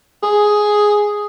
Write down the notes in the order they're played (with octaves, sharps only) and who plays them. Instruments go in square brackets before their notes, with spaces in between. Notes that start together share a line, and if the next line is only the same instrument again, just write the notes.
[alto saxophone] G#4